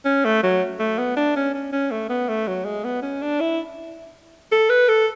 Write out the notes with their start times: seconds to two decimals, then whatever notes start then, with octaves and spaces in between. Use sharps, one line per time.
0.05 C#4
0.25 A3
0.43 F#3
0.79 A3
0.98 B3
1.17 D4
1.36 C#4
1.54 C#4
1.72 C#4
1.91 A3
2.09 B3
2.29 A3
2.48 F#3
2.65 G#3
2.84 B3
3.02 C#4
3.22 D4
3.40 E4
4.52 A4
4.70 B4
4.89 A4